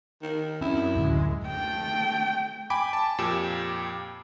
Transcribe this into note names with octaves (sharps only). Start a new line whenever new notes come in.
D#3
F#2 C4 C#4 E4
D1 D3 G#3
A3 G5
G5 G#5 B5 D6 D7
A5
F2 A#2 G4 E7